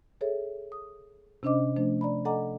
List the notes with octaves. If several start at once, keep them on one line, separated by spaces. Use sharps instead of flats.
G#4 A4 C#5 E5
D#6
C3 C#4 D4 C5 D#5 D6
F3 A3 D4 C5
D5 A#5 B5
A4 D#5 F#5 G#5 A#5 D6